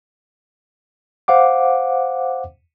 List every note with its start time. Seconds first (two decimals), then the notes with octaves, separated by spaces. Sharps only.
1.28 C5 F5 F#5 D6